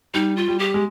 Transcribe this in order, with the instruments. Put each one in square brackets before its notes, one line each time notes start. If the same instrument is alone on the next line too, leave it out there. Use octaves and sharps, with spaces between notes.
[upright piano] G3 [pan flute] D#4
[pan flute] F4
[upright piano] G3
[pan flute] G4
[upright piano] G#3